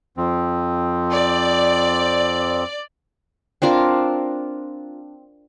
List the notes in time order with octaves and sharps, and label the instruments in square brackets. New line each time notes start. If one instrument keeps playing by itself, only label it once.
[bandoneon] F2 F3 C4
[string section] D5
[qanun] C4 D4 F4 A#4